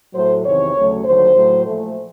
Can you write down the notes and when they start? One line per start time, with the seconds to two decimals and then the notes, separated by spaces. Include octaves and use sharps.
0.14 A2 F#3 A3 C5
0.44 E2 C3 D#3 C#5
0.74 D2 C#3 F#3 A3
1.04 D#2 D3 F#3 C5
1.34 A2 F#3 A3
1.64 A#2 F3 A3